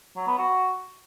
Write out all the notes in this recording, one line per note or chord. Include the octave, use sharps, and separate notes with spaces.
F#3
B3
F#4